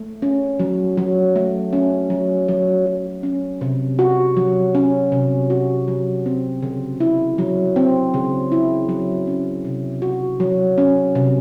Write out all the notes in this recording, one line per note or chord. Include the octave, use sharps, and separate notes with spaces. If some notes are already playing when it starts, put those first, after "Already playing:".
Already playing: A3
C#4
F#3
F#3
A3
C#4
F#3
F#3
F#3
C#4
C3
F#4
F#3
C#4
C3
F#4
F#3
C4
C#3
E4
F#3
C4
C#3
E4
F#3
C#4
C3
F#4
F#3
C#4
C3